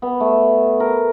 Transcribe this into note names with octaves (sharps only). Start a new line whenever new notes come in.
B3
A3
A#4